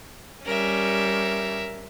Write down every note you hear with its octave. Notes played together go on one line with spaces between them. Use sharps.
G3 C#4 A#4 E5